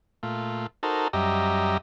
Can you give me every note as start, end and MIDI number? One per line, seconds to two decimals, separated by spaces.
0.23 0.67 46
0.23 0.67 57
0.23 0.67 65
0.83 1.08 63
0.83 1.08 66
0.83 1.08 69
0.83 1.08 70
0.83 1.08 72
0.83 1.08 81
1.13 1.78 42
1.13 1.78 55
1.13 1.78 67
1.13 1.78 75
1.13 1.78 76
1.13 1.78 82